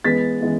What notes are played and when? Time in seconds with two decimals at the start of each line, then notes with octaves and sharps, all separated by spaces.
0.04 E3 G#3 B3 A6 B6
0.41 E3 G#3 B3